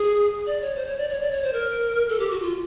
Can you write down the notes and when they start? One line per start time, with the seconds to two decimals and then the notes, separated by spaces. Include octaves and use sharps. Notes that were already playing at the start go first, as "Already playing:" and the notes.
Already playing: G#4
0.46 D5
0.61 C#5
0.75 C5
0.87 C#5
0.98 D5
1.09 C#5
1.21 D5
1.31 C#5
1.43 C5
1.53 A#4
2.09 A4
2.19 G4
2.31 F#4
2.42 F4